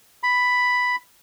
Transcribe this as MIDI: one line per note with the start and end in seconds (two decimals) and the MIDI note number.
0.23 0.96 83